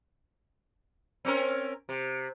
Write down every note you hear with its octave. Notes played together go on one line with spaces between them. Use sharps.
C4 C#4 A#4
C3